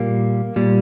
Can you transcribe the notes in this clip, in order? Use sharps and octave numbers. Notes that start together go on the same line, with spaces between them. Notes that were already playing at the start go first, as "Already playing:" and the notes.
Already playing: A#2 G3 A#3
A#2 G3